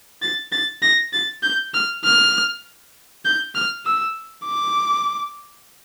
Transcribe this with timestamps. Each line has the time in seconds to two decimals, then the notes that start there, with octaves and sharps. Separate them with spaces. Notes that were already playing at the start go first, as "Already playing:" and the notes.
0.22 A6
0.52 A6
0.82 A#6
1.13 A6
1.43 G6
1.74 F6
2.04 F6
3.25 G6
3.55 F6
3.86 E6
4.45 D6